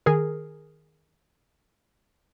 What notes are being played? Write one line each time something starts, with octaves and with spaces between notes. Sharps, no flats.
D#3 G#4 A#4